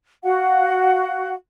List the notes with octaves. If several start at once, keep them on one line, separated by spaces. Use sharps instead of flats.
F#4 F5 F#5